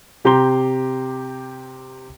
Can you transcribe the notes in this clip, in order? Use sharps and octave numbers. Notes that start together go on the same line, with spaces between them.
C3 G4 A#5 C6 G7